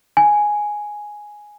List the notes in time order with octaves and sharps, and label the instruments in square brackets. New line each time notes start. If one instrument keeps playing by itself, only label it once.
[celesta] G#5